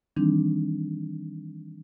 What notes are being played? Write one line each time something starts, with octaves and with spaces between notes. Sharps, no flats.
D#3 E3 G3 C4 D4 D#4